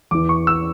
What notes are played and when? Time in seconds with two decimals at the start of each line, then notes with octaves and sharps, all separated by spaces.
0.11 E2 E3 D6
0.29 C#6
0.47 E6